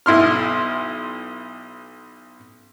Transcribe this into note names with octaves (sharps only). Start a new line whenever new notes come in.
B1 E4 C6 F6